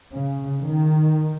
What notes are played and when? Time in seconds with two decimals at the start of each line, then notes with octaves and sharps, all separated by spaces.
0.14 C#3
0.64 D#3